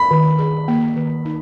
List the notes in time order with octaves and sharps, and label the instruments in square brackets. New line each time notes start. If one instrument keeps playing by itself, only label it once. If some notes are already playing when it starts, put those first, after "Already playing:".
Already playing: [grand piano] B5
[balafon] D#3
G#4
A#3
D#3
D#4